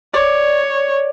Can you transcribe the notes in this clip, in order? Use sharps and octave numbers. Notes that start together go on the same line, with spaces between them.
C#5 D5